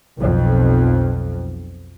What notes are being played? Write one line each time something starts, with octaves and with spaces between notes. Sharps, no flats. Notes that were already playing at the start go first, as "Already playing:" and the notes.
B1 F2